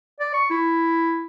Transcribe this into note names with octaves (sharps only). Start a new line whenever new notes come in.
D5
C#6
E4